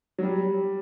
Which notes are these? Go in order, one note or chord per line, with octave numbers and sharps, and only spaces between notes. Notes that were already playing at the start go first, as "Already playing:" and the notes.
F#3
G3